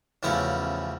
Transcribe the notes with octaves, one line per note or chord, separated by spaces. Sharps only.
A1 E2 C#3 F3 E4 C#5